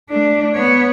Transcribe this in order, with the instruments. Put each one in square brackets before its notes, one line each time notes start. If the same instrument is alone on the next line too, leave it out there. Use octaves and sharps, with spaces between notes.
[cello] A3 D4
B3 C#5